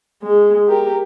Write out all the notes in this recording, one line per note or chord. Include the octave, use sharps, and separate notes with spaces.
G#3
G4 A#4